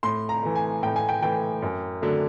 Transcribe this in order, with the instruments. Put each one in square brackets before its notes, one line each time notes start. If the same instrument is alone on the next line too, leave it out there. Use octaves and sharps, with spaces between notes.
[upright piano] A2 C6
A#5
E3 A3
G#5
A2 G5
G#5
G5
E3 A3 G5
F#2
D3 F#3 A3 D4